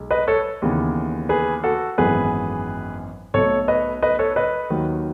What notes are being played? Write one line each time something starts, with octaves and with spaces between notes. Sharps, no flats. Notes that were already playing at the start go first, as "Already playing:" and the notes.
Already playing: B1 G#3
B4 D#5
A4 C#5
D#2 C#3 E3 B3
G#4 B4
F#4 A4
G#1 F#2 E3 B3 G#4 B4
B1 B2 A3 A4 C#5
B4 D#5
B4 D#5
A4 C#5
B4 D#5
D#2 D#3 F#3